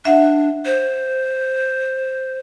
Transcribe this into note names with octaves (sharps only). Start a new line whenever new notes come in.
D4 E5 F#5
C5